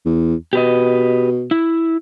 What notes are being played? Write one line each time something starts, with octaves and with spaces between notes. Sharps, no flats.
E2
B2 G4 B4 D#5
E4